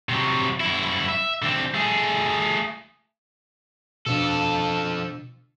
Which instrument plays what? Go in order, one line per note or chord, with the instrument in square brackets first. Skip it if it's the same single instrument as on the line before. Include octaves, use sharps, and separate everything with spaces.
[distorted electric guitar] C3 F#3
F#2 E4
E5
D3 C4
A3 G#4
[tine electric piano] B2 D4 [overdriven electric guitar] F3 A4